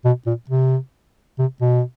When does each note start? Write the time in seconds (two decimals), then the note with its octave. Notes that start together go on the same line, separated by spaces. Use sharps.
0.05 B2
0.26 A#2
0.50 C3
1.39 C3
1.61 B2